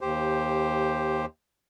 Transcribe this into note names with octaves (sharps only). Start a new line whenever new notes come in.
D#2 G4 C5